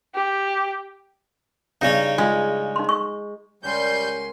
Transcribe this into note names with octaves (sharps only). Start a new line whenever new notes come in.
G4
G2 C#3 C#4 D#4
G#3 F4
D#4 C6
C#6
C#2 G3 C#4 A#4 F5 C6 G6